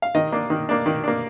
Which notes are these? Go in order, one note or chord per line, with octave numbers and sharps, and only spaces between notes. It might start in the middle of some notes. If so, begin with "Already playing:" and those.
F5
D#3 D#5
A#3 D4
D#3
A#3 D4
D#3
A#3 D4